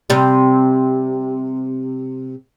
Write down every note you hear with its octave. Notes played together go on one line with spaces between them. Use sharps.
C3 G3